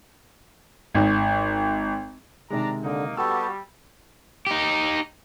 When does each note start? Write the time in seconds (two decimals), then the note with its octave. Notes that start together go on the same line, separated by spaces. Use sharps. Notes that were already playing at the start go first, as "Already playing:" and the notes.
0.95 G#1
2.50 C3 D#3 G#3 D4 D5 A#5
2.82 D3 A#3 D#4
3.17 G3 B3 F#4 G4 A4 E6
4.47 D#4 G4